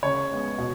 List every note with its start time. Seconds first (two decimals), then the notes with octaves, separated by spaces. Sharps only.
0.03 C#3 C#5
0.31 G#3 B3
0.58 B2